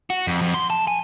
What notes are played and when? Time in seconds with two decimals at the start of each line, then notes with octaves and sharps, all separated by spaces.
0.10 F#4
0.27 F2
0.42 F2
0.54 C6
0.70 A5
0.87 G#5